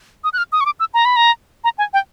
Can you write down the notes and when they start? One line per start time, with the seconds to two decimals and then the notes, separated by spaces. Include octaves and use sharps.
0.24 D#6
0.33 F#6
0.38 F6
0.52 D#6
0.61 C#6
0.66 D6
0.80 E6
0.94 A#5
1.05 B5
1.16 A#5
1.64 A#5
1.78 G#5
1.93 G5